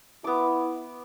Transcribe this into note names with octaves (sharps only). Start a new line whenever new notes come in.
B3 E4 D6